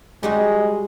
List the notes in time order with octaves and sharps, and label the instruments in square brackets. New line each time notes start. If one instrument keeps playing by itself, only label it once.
[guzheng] G3 D#4 F#4 [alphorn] G#3